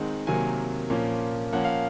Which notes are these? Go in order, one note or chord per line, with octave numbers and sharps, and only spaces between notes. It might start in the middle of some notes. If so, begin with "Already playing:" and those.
Already playing: D#3 G#3 C4 D#4 F#5
C3 D#3 F#3 A#3 G#5
A#2 F3 A#3 C#4
F3 A#3 C#4 F#5
F5